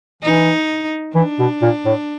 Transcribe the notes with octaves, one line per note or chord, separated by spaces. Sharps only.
E3 D#4
E3 D4
B2
A#2
A2